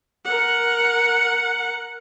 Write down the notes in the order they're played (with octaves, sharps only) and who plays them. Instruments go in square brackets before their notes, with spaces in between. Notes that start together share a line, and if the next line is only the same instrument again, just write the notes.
[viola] A#4 F#5